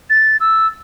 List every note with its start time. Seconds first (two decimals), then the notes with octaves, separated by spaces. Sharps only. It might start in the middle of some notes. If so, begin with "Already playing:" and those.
0.10 A6
0.40 E6